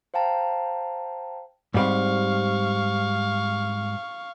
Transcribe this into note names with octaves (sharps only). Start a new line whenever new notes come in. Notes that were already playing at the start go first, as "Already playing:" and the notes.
C5 F5 G5 A5 A#5
G#2 G3 C4 F5 C#6